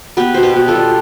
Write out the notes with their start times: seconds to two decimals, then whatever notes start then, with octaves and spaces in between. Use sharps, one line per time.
0.17 B3 G4 B4
0.34 B2 C5
0.43 G4 B4
0.56 B2
0.68 F4 A4
0.75 G3